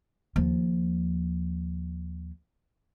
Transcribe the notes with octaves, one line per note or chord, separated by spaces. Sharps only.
D#2 F3